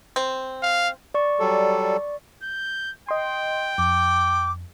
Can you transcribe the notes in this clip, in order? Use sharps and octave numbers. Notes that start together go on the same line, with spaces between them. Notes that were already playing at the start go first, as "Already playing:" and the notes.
C4
F5
D5 C#6
F#3 G3 A4
G6
D#5 G5 C6
F2 D6